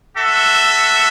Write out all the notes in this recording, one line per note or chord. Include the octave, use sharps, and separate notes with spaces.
F#4 A4 E5